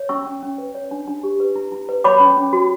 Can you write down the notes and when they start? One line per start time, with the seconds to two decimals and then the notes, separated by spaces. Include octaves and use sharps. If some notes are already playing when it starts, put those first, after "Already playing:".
Already playing: C#5
0.09 C#4 C#6 E6
0.26 C#4
0.43 C#4
0.58 B4
0.75 C#5
0.91 D4
1.07 D4
1.23 G4
1.40 B4
1.56 E4
1.72 E4
1.89 B4
2.04 C#5 B5 D6
2.20 C#4
2.37 C#4
2.53 F#4